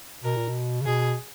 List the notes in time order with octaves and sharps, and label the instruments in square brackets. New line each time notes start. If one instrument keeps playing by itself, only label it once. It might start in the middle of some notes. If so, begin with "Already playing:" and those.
[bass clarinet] B2 [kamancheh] A#4
[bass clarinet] A#2
B2
C#3
[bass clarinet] B2 [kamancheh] G#4